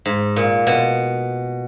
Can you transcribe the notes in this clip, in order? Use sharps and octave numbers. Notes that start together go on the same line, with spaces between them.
G#2
A#2
B2